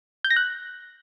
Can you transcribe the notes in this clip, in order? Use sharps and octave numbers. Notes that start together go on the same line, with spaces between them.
G6
A#6
F#6